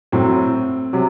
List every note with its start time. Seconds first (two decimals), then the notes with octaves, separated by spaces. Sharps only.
0.12 A2 F#3 C4
0.93 C3 F#3